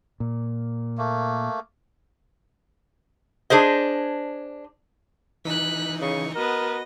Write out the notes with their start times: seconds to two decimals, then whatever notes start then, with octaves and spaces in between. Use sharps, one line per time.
0.20 A#2
0.98 A3 A#3
3.50 D4 G#4 C5 D#5
5.45 E3 D#4 F#6 B6
6.01 C#3 C#6
6.35 B3 F#4 A#4 D#5